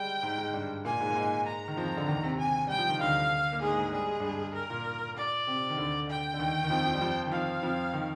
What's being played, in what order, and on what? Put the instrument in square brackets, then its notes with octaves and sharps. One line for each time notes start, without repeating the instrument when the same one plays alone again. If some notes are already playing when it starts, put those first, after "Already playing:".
Already playing: [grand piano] G3 G#3 [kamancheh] G5
[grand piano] G#2 G#3
G#2 G#3
G2 G3
[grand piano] A#2 A#3 [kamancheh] G#5
[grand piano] G#2 G#3
A#3
G#2 G#3
[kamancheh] A#5
[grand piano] D#3
F2 F3
D3
D#2 D#3
C3
[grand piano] C3 [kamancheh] G#5
[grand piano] G3 [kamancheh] G5
[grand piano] F3
D#3
[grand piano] D2 D3 [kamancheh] F5
[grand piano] A#3
[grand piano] G#2 G#3 [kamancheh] G#4
[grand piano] G#2 G#3
[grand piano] G3 [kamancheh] G#4
[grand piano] G#3
G2 G3
[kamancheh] A#4
[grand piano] A#2
[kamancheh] D5
[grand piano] C3
D#3
D2 D3
[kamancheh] G5
[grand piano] D3
D#2 D#3
D#3
F2 F3
F2 F3
G3
F2 F3
D#3
[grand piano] F2 F3 [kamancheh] F5
[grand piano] F2 F3
D#3